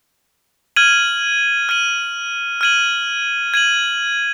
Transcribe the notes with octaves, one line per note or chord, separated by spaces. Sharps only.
F6 G#6 D#7 F#7
F6 G#6 D#7 F#7
F6 G#6 D#7 F#7
G#6 D#7 F#7